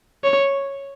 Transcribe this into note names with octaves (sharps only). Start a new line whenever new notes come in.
C#5